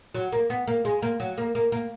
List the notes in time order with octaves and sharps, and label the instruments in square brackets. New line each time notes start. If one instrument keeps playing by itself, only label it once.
[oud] F#3
A#3
B3
A#3
G#3
A#3
F#3
A#3
A#3
A#3